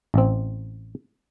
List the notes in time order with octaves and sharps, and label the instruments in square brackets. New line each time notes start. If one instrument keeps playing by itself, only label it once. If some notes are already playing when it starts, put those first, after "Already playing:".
[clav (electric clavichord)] A1 C4